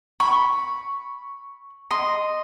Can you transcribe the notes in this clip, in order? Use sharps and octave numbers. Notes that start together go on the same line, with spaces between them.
B5 C#6
D#5 C6